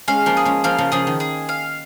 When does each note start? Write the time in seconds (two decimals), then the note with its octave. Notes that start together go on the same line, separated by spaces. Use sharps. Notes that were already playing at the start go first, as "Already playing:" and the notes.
0.08 G#3 C#4 F5
0.26 F3 A#3
0.37 G#4
0.45 G#3 C#4
0.64 F3 A#3 F5
0.78 C#3 F3
0.92 C#3 F3 G#4
1.07 D#3
1.20 G#4
1.49 F5